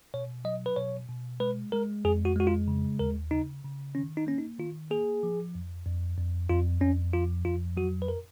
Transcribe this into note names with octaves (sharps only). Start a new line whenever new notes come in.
B2 C#5
F#3 D#5
B4
B2 C#5
B2
G#3 B4
G#3 A#4
F2 G#4
F#4
G#3 F#4
F4
C#3
D#2 A#4
C#3 D#4
C#3
D#3 C#4
D#4
A#3 C#4
D#4
D#3 F4
A#3 G#4
F3
F2
F2
F2
F2 F4
F2 C#4
F3 F4
F2 F4
F#3 F#4
B4
A#4